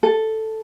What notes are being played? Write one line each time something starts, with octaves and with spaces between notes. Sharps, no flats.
A4